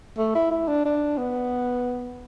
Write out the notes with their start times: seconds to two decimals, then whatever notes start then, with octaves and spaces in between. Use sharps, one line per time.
0.18 A3
0.35 E4
0.51 E4
0.68 D4
0.85 D4
1.18 B3